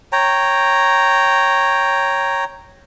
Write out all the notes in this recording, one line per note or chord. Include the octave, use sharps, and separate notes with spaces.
C#5 G5 A#5